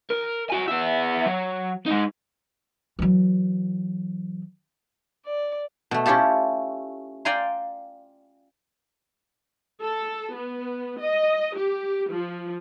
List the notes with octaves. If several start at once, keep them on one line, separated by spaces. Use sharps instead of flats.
A#4
F#4 G#5
B3 E5
F#3
G#3 D#4
E3 F#3
D5
B2 A3
C#4 E4 F4 G4 A4
D5 F5 G5 G#5 A#5 C6
A4
B3
D#5
G4
F3